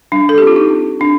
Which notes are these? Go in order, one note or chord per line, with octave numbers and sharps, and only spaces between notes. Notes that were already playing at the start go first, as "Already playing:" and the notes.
G3 D4
A4
C4 G4
F4
D#4
C4
C4 D4